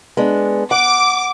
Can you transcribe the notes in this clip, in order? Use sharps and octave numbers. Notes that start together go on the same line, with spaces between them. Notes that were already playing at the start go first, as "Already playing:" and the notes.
G#3 B3 D4
F#5 D6